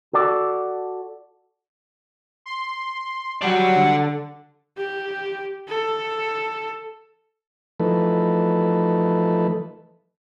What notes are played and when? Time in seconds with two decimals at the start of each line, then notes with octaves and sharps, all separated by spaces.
0.13 F#4 A4 D5
2.46 C6
3.42 F#3 G3 D5 F#5
3.75 D3
4.78 G4
5.69 A4
7.80 E3 F3 A3 D#4 A4 B4